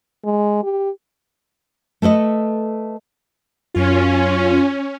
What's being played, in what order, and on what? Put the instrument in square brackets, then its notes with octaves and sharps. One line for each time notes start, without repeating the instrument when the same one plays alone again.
[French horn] G#3
G4
[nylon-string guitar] A3 A4 B4 D#5
[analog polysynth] F#2 F4 [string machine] C#4